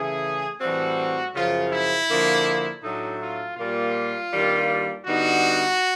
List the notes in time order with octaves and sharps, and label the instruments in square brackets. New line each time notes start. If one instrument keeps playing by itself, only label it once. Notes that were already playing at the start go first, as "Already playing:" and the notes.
Already playing: [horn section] C#3 E3 A3 G#4
A2 E3 G3 C4 F#4
F#2 C#3 F3 F4
E4
D3 F3 A#3 D4
A2 F#3 A3 D4 D#4
F4
A#2 G3 A#3 F4
G2 D#3 G3 A#3
D3 G3 B3 D#4 F#4